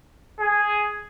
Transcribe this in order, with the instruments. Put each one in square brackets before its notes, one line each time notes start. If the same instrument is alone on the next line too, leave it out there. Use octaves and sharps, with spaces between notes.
[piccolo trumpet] G#4